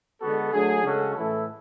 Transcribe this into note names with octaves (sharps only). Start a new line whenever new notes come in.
D3 G#3 B3 F#4 A4
F#3 A3 D4 G#4
C#3 G#3 C#4 F#4 A4
A2 E3 A3 E4 A4